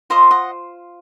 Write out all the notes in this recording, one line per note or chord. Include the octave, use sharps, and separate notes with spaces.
F4 C5 D#5 A#5 C#6
D#5 F#5